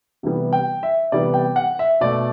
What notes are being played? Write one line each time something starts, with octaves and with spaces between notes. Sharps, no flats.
C3 E3 G3 B3
G5
E5
C3 E3 G3 B3 D5
G5
F#5
E5
B2 A3 D5